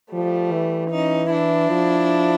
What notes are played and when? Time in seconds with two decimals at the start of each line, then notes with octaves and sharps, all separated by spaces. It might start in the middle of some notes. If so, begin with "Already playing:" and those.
0.13 F3 G3 A3
0.51 E3
0.92 C#4 D#4
1.30 D4 E4
1.69 F3